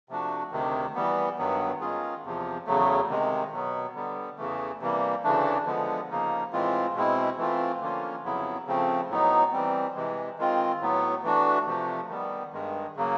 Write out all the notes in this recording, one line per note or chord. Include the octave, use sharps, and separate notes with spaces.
C3 F3 A3 D4 F#4
D2 C3 D#3
E3 G3 B3
G2 D#3 F#3 B3
D#3 G#3 C#4 F4 G#4
E2 C3 F3
E2 C#3 F#3 A3
C3 D#3 G#3
B2 F#3 B3
D3 G3 B3
E2 C#3 E3 A3
C3 E3 G3 A#3
D2 C#3 E3 A3 D4
D3 F3 G#3 B3
C#3 F3 A#3 D#4
A2 E3 G#3 C4 F4
B2 G#3 C4 E4
E3 A3 C4 F4
D3 F3 A#3 C#4 F4
F2 C#3 F#3 B3 E4
C#3 F3 A3 C4
A2 F#3 B3 D#4
E3 G3 C4
C3 E3 G#3
D#3 G#3 C4 F4
A2 F#3 B3
E3 A3 D4 F#4
C3 F3 A3
D#3 G3 B3
G2 D#3 G#3
C#3 F#3 A#3